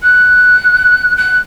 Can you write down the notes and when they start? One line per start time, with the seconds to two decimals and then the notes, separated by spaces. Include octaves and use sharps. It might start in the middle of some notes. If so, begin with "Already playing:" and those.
0.03 F#6
1.18 F#6